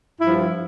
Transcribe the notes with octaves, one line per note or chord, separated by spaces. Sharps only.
G2 F3 E4